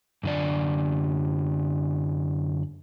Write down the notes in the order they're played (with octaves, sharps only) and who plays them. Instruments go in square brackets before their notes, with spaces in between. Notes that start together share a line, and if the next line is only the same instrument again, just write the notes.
[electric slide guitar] F#2 D3 D5